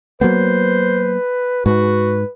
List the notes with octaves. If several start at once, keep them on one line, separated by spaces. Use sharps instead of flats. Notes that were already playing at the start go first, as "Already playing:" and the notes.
F#3 A#3 B3 B4 C5
G#2 F#4 B4